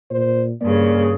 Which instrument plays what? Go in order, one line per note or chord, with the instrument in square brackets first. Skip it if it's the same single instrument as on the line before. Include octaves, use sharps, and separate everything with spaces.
[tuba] A#2 [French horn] C5
[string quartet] G2 C#3 [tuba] A#3 [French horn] D5